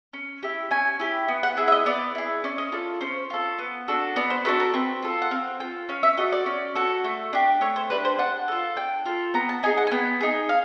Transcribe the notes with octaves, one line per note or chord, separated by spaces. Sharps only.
C#4
E4 G4
C#4 G#5
E4 G4
B3
F#5
E4 G#4 E5
E5
D#5
B3 D5
E4 G#4
C#4 D5
D#5
F4 A4 D5
C#4 C5
F4 A4
B3
D4 F#4 A4
B3 D5
C5
D4 F#4 A4 B4
A#4
C4 B4
F4 A4
F#5
C4 F5
F4 A4 G5
C#4 F5
E5
F#4 A4 D#5
D5
C#4
F#4 A4
A3
D4 G4
A3 C#5
C5
D4 G4 B4
C5
D4 F#5
F4 A4
D4 G5
F4 A4
B3 A#5
A5
D#4 G#4 G#5
F#5
G#5
B3 G5
D#4 G#4
F5